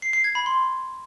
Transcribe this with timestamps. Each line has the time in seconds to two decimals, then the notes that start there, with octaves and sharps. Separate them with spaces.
0.02 C7
0.13 C7
0.24 G#6
0.35 B5
0.46 C6